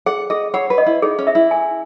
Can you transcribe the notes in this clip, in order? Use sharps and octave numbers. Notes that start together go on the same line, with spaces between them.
G#4 F#5
G#4 D#5
C#5 F#5
B4
D#5
E4
D#4 G#4
C#4
E5
E4
G#5